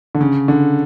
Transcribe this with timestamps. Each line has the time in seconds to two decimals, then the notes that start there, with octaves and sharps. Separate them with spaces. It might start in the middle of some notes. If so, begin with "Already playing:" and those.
0.15 D3
0.21 C#3
0.48 D3